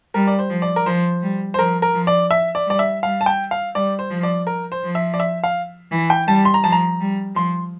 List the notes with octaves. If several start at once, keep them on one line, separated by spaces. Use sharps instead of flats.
G3 A#4
D5
C5
F3
D5
A#4
F3 C5
G3
C5
F3 A#4
A#4
F3
D5
E5
D5
G3 D5
E5
G3 F5
A5
G5
F5
G3 D5
C5
F3
D5
A#4
C5
F3
E5
D5
E5
F5
E3
G5
G3 A5
C6
A#5
F3 A5
A#5
G3
F3 C6